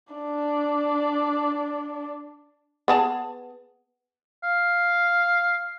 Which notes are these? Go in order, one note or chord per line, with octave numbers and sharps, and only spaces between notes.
D4 D5
B3 G#4 A5
F5